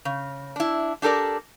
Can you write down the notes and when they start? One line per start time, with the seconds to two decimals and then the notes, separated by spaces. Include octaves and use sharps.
0.05 C#3
0.56 D4 E4
1.02 D4 G4 A4 A#4 D5